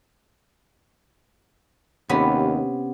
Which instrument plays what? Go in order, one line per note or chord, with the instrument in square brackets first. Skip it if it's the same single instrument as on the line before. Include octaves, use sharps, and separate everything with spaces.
[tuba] D#2 [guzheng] C3 B3 C#4